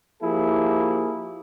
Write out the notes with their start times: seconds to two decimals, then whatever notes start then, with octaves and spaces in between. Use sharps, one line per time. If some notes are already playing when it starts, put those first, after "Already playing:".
0.23 F3 A#3 E4 G4 G#4